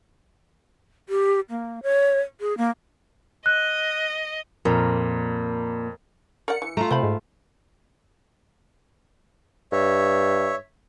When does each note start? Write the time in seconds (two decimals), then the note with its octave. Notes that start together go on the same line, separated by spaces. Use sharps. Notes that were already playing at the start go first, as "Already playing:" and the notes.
1.09 G4
1.50 A#3
1.83 C#5
2.41 G#4
2.58 A#3
3.46 D#5 F#6
4.65 F2 A#2 A#4
6.48 A#4 D5 F#5 C#7
6.62 E3
6.77 A3 F4 A#5
6.91 C3 C5 G5 B5
7.03 G#2
9.72 G2 C#5 E5